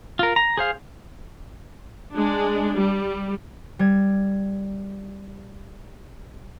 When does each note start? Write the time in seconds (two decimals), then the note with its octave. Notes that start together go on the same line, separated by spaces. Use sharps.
0.19 F4 A#4
0.36 A#5
0.57 G#4 C5 F5
2.14 G#3 D4
2.77 G3
3.79 G3 G#6